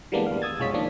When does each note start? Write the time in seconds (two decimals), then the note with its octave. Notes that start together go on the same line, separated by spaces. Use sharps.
0.12 E3 G3 G#3 A#3 B3 D4
0.26 D#2 F5
0.42 D#6 E6 G#6 A6
0.59 B1 F#2 G#3 F4 C#5 B6
0.74 D#3 F3 A#3 D4